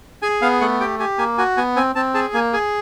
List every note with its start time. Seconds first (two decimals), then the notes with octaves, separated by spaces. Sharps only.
0.22 G#4 G#5
0.42 B3 F5
0.61 A3 F#5
0.80 G4 G5
0.99 G4 G#5
1.18 A#3 G#5
1.38 F#4 G#5
1.57 B3 G#5
1.76 C4 G#5
1.95 C4 A5
2.14 G#4 A5
2.34 A#3 G#5
2.53 G#4 G#5